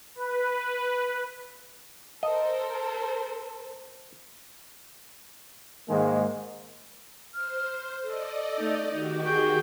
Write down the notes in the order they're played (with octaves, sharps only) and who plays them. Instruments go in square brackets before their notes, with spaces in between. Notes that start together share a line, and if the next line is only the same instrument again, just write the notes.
[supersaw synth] B4
[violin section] A4 A#4 C5 [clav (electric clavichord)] D#5
[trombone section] G#2 D#3 G#3 A#3
[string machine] C5 [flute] F6
[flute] A4 [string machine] D5 D#5
[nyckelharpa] A3 D#4
[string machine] D#3 F#4 G4 [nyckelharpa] D#4
[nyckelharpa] G#4 G5 [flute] C#6